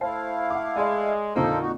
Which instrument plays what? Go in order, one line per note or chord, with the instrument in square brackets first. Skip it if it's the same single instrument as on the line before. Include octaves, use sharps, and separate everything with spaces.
[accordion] A3 E4 F5 [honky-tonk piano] C5 A5 C7
[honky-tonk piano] F#5 D6
[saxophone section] G#3 [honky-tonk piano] D5 D#5
[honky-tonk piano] F2 A#2 D3 [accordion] F3 A4 C5 [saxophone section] A#3 D#4
[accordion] D#4 F#4